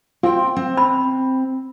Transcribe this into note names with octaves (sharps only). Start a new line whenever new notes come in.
C4 F4 G5
C4
B5